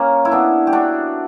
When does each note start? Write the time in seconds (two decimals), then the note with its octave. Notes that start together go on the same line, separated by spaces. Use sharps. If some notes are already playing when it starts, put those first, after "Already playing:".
Already playing: A#3 C#4
0.25 E4
0.31 B3 D4
0.67 G4
0.73 D4 F#4